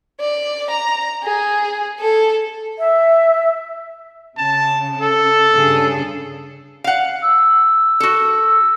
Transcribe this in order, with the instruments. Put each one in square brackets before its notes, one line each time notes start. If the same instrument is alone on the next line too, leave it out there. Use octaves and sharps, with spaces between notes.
[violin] D5
A#5
G#4
A4
[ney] E5
[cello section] C#3 [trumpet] A5
[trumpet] A4
[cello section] G2 C#3 G#4
[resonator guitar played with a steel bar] F5 F#5
[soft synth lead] E6
[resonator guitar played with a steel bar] F#4 A4